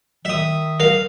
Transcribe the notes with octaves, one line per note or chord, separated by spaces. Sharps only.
D#3 E5 D#6
A#4 F5